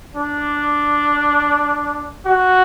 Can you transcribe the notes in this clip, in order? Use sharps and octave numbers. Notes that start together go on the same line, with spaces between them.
D4
F#4